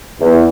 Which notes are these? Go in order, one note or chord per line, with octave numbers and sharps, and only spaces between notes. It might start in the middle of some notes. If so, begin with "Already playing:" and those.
E2